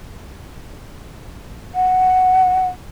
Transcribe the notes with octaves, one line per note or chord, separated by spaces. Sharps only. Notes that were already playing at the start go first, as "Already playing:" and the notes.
F#5